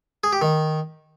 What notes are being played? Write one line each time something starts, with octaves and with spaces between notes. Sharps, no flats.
G#4
G4
D#3